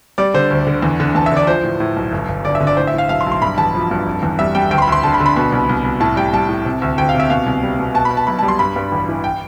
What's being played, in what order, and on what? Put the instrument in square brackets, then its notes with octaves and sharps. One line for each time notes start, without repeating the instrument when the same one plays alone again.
[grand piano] G3 D5
D3 C5
D2
D3
E2
D3
E2 A5
E5
D3 D5
F3 C5
A2
A2
B1
G1
G1
D3 D5
E5
D3
D5
A2 C5
E5
A2 F5
B1 F5
C6
B1
C6
G2 B5
A1 A5
F3
G2
F1
E2
G3 E5
G3 G5
D2 G5
C6
B5
D2
C6
D3 A5
B5
D3
B5
B2
C2
C2
C2
A2 A5
G3 G5
G3 A5
A2
C3
D2
D2 G5
F5
C3
E5
B2 F5
C2
G3
B2
B2 A5
B5
B2
A5
B1 B5
A5
G3
C6
G2 B5
G2
A1
E3
G5